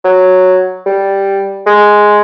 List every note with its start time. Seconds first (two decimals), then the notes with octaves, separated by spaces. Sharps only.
0.04 F#3
0.86 G3
1.67 G#3